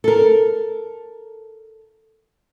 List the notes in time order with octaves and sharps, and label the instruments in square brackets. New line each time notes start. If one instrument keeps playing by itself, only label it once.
[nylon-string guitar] A4 A#4